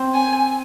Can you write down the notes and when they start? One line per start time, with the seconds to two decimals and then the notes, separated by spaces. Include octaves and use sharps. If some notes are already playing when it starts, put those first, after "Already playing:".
Already playing: C4
0.14 G#5